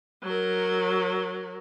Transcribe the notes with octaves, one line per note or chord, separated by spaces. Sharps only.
F#3 A#4